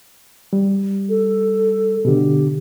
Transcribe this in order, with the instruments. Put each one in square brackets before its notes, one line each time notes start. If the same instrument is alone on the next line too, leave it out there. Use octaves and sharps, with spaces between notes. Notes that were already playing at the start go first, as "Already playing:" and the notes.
[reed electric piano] G3
[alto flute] A4
[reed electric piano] B2 D3 [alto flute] G4